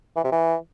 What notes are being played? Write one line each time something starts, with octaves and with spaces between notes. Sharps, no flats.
E3
C3
E3